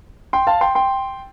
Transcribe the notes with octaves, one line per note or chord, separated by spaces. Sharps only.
G5 C6
F5 A5
G5 C6
G5 C6